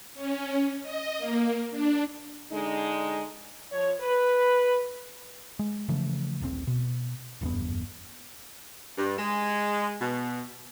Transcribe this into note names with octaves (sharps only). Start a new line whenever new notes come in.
C#4
D#5
A#3
D4
D3 G#3 D#4
F3 C#5
B4
G#3
C#3 E3 F3 A3
D#1 A#1 A#2 C4
B2
F#1 E2 G2 B3
G2
G#3
B2